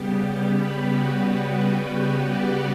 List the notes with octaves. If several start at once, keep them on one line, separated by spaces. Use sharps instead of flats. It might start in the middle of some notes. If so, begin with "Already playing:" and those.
Already playing: C#3 G3 B3 G4
G4
B4
F#4
G4
D5